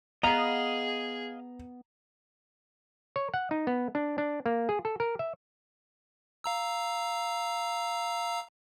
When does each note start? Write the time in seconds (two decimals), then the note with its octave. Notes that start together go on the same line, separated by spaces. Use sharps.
0.23 B3 G#4 D#5 F5 A#5
3.16 C#5
3.34 F#5
3.51 D#4
3.67 B3
3.95 D4
4.18 D4
4.46 A#3
4.69 G#4
4.85 A4
5.00 A#4
5.19 E5
6.44 F5 A#5 E6